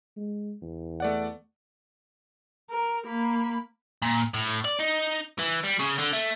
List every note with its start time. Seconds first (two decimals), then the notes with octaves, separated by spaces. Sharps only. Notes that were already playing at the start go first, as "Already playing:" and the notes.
0.17 G#3
0.62 E2
1.00 A3 D5 F#5
2.70 A#4
3.07 A#3 B5
4.02 A#2
4.34 A2
4.65 D5
4.80 D#4
5.39 E3
5.64 G3
5.80 C#3
5.99 D3
6.13 A3